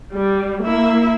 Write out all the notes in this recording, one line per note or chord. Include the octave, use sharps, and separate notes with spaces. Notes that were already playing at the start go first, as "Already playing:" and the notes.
G3
A#3 E4 E5